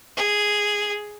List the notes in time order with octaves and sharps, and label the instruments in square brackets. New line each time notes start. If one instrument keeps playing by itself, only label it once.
[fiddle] G#4